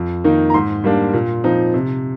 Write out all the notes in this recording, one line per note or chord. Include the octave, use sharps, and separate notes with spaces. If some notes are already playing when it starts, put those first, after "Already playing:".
Already playing: F2
D#3 A#3 D#4
A#5
G#2 C6
G3 A#3 D4
A#2
F3 C4 D#4
C3